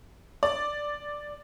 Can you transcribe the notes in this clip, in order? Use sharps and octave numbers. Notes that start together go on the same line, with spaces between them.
D5